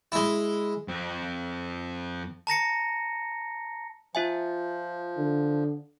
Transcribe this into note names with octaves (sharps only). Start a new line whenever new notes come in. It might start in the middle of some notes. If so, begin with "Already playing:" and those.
G#3 E4
F2 C4
A5 A#5 A#6 C#7
F3 F4 E5 G#5
D3